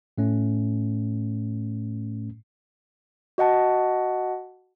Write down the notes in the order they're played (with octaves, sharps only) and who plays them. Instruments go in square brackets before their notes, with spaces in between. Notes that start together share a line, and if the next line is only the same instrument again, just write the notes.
[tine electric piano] A2 A3 C#4
[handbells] F#4 D#5 F#5 A5